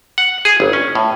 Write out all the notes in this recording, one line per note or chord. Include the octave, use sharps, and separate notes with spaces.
F#5
G#4
G1
C#4
A2